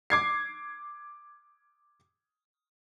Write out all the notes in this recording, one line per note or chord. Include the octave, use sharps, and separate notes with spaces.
D6 G#6 C7